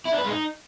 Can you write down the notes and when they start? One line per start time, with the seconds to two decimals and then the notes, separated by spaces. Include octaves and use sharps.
0.05 E4
0.12 D4
0.18 B4
0.24 G#3
0.31 D#4